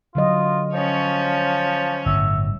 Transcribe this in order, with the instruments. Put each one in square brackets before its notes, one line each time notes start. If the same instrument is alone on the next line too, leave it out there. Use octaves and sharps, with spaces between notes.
[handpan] D3 F#3 D#5 [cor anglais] F4
[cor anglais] F3 [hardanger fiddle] C#4 C#5
[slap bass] G1 A2 [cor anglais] E5